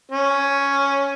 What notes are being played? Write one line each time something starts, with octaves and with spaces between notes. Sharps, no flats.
C#4